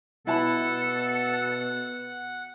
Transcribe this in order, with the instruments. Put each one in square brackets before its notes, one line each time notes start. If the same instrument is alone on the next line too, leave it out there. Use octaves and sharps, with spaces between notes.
[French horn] B2 [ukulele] E4 A5 B5 [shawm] A4 [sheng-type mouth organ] F#5